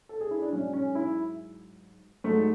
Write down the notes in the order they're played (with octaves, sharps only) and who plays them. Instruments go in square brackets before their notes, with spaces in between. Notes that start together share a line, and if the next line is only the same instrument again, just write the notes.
[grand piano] A4
G#4
E4
D4
G#2 F#3 C#4
C#4
E4
G#2 F#3 A3